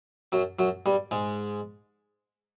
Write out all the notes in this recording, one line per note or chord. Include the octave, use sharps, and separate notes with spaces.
F#2 F#3
F#2 F#3
G2 G3
G#2 G#3